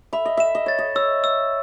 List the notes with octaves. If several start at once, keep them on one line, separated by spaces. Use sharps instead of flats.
E5 B5
D#5
E5 E7
D#5
C#5 A6
D#5
C#5 E6
E6